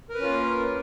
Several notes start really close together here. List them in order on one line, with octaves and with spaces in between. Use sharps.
A#4 B4 C#4 F4 A#3